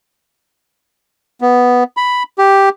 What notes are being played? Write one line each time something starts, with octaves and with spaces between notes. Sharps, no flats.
B3
B5
G4